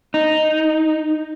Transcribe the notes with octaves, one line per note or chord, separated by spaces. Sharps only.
D#4